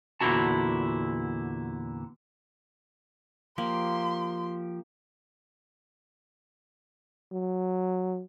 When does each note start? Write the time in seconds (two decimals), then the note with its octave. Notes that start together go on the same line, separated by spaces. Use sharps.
0.21 E2 A#2 D3 E4 F#4 A5
3.58 F3 A#3 G4 C6
7.32 F#3